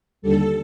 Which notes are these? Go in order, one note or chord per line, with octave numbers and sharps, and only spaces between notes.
D#2 D3 G3 A4